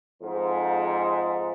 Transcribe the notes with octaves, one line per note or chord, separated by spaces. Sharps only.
F2 G#2